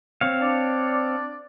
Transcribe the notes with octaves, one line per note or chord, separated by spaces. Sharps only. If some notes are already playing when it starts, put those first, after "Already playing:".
C4 C#5 F5
D4 D5